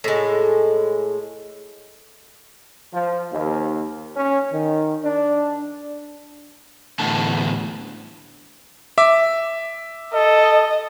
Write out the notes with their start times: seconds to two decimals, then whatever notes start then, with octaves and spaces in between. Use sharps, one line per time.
0.04 A2 G#3
2.93 F3
3.32 D#2
4.16 C#4
4.52 D#3
5.04 D4
6.99 E2 A2 D3 A5
8.98 E5 D6
10.14 A4 D#5